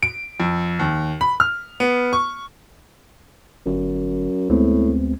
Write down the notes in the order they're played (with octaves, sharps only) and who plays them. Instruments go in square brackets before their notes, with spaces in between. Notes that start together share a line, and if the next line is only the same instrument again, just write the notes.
[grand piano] D7
F2
D#2
B5
F6
B3
C#6
[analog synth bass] G1 [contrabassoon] F#2
[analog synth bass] D2 [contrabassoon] A2 [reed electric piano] G#3 B3 C4